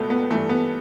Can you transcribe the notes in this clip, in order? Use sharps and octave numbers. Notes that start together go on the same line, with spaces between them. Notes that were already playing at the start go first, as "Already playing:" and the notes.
Already playing: C#2 B2 A3 B3
B3
G2 E3 A3
B3